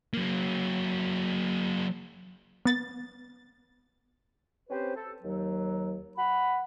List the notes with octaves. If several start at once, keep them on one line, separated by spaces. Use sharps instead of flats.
F#3 A#3
B3 A6
C4 C#4 G4 B4 C5
A4
D#2 F#3
F#5 B5